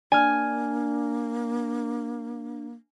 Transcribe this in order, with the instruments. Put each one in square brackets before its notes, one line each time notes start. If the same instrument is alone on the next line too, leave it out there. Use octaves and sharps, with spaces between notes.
[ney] A#3 [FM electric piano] D4 [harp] G#5 F6